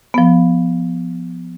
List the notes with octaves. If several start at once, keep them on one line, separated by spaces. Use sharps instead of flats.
F3 B3